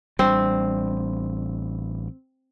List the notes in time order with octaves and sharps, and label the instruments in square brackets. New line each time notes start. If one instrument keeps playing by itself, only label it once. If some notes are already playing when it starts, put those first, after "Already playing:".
[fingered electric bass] A1 G3 D4 [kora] C4